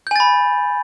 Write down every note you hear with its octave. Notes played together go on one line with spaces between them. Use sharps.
G#5 B5 G6 A6